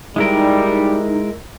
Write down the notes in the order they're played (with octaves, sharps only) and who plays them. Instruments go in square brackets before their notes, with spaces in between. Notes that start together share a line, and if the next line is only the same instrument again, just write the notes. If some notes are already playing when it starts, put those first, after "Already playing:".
[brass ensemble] G3 [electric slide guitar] G#3 E4 A#4 [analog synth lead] D#4